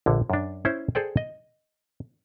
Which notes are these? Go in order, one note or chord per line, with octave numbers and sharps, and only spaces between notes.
A#1 D3
F#2 D4
C#4 E4 C5
G#4 A4 C5 D5 G5
D#5